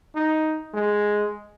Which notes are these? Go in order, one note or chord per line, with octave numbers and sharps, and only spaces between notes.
D#4
G#3